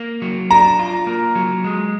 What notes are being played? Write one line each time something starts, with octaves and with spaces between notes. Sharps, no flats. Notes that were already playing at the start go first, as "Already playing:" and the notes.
Already playing: A#3
F#3
D4 A#5
F4
A#3
F#3
G#3